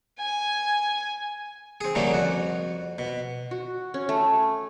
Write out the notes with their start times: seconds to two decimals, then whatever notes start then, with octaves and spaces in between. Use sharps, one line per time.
0.19 G#5
1.81 C4 G#4
1.95 D3 F3 G3 A3 A#3 C#4
2.11 F2 F#4
2.98 B2
3.51 F#4
3.94 C#4
4.09 A3